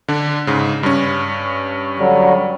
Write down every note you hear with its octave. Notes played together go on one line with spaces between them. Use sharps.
D3 D4
G#2 C#3
G2 C#4
D3 F#3 G3